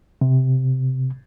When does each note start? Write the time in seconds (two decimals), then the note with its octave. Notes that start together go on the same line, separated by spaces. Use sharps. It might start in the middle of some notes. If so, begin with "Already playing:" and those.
0.21 C3